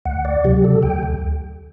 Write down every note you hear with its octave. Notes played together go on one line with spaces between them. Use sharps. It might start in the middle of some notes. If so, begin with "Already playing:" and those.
D2 F#5
D5
C3 F#3 G4
A4
D2 G5